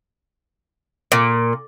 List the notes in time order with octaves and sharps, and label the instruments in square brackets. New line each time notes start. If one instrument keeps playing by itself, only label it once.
[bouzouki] A#2